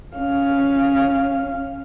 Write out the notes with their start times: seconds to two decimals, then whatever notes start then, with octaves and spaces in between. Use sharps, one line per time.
0.16 C#4 F5